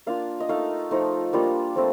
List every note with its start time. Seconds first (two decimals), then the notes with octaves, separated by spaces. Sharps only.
0.06 A#3 D4 F4 F5
0.40 D#5
0.49 A3 D#4 F5
0.91 F3 A3 D#4
1.33 G3 A#3 D4 F4
1.75 F3 A3 C4